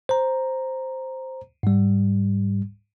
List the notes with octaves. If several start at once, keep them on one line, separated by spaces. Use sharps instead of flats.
C5 A#5
G#2 G3